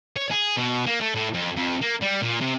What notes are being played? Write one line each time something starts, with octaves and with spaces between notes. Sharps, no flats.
C#5
G#4
B2
A#3
A3
A2
F2
F2
A#3
G3
A#2
C3